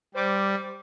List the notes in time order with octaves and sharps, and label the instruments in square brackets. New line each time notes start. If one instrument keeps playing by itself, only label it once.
[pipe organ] G3 [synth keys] C5 D6